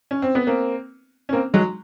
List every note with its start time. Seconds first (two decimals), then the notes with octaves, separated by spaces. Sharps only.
0.11 C#4
0.22 C4
0.35 B3
0.47 A#3 C4
1.29 C#4
1.33 A#3 C4
1.54 F#3 G#3